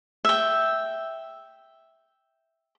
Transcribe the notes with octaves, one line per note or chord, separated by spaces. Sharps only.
E5 G5